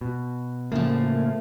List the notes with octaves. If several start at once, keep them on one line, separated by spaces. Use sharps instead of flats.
B2
A2 C#3 F3 A3 A#3